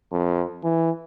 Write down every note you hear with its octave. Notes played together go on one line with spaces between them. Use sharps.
F2
E3